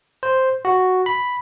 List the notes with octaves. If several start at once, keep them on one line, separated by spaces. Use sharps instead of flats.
C5
F#4
B5